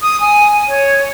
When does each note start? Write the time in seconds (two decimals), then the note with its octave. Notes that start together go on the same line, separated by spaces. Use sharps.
0.01 D#6
0.20 G#5
0.68 C#5